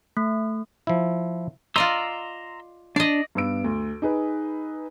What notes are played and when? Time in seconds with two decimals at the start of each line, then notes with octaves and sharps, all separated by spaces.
0.17 A3
0.87 F3 E4
1.76 F4 D5 D#5 A#5 C6 E6
2.96 D4 D5 D#5
3.35 G2 B3 E6 D7
3.64 D2
4.02 D#4 G#4 B4